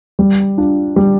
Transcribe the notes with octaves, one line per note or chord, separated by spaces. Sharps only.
G3
D4 F4
G3